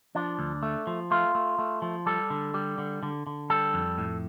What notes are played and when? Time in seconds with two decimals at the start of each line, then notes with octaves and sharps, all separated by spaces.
0.15 F3 D4
0.39 D2
0.63 A3
0.87 F3
1.11 A3 F4
1.35 A3
1.59 A3
1.82 F3
2.06 G3 A4
2.30 D3
2.54 G3
2.78 D3
3.03 D3
3.27 D3
3.50 G3 A4
3.74 F2
3.98 A2